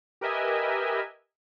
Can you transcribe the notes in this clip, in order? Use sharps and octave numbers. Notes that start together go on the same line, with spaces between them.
G4 A#4 B4 D#5 E5 G#5